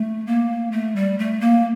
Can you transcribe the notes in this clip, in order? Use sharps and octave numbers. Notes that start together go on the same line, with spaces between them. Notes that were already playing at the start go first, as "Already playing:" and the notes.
Already playing: A3
A#3
A3
G3
A3
A#3